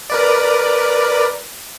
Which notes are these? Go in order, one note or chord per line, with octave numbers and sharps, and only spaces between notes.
A#4 B4 D5